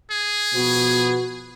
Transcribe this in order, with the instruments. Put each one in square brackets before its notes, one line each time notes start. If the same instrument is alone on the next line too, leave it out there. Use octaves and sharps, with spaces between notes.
[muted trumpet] G#4
[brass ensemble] B2 F3 B3 [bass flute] F#4